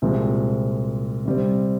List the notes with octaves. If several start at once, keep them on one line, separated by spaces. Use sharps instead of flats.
C2 A#2 F3 G#3 C4
C3 G3 C4